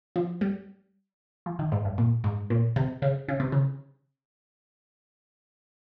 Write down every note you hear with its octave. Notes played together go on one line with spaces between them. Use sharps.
F3
G3
F3
D#3
G#2
G2
A#2
G#2
A#2
C3
C#3
C#3
C3
C#3